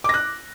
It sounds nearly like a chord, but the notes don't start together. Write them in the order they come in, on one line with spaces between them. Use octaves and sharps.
D6 A#6 F#6